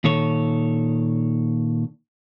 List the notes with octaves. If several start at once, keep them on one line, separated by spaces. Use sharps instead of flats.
A#2 D#3 A4 C#5